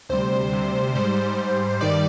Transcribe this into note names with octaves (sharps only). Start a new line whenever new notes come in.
D2 C3 G3 C5
D2 C3 G3
G#2 G3 C5
G#2 G3
C5
G2 D#3 G3 D5